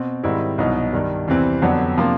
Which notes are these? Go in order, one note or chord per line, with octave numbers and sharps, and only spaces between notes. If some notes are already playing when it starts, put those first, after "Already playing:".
Already playing: B2 C4
G#2 D#3 G3 C4 E4
C2 B2 F#3 B3 D#4
G2 D#3 G3
E2 C3 E3 G3 C4
F2 D3 F#3 B3 D4
C3 F3 A#3 D4